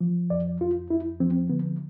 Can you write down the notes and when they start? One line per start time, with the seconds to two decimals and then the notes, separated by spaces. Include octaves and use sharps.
0.01 F3
0.30 F2 D5
0.61 F2 F4
0.90 F2 E4
1.20 F3 C4
1.49 D3 B3